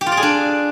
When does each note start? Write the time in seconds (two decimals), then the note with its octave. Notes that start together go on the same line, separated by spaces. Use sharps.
0.01 G4
0.06 F4
0.12 D5
0.17 G#4
0.23 D4